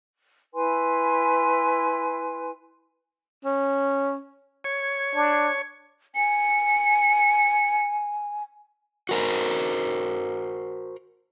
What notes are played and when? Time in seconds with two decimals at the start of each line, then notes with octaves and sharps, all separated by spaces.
0.54 E4 B4 G#5 C6
3.45 C#4
4.64 C#5
5.15 D4
6.15 G#5 C#7
9.09 F#4 A#4 C5